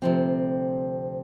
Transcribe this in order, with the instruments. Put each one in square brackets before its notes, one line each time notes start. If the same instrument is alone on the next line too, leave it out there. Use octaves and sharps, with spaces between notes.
[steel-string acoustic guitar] D2 C3 F3 C4